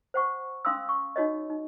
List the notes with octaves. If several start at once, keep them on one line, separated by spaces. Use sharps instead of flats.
C5 F#5 C#6
C#4 F5 C6 D#6 E6
C#6
D#4 F#4 C#5 D#5
D#4